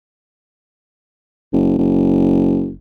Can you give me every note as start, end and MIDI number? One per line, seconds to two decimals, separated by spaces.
1.53 1.74 30
1.78 2.73 30